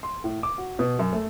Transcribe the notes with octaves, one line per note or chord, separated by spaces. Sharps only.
C6
A2
D6
F#4
B2
F#2
A3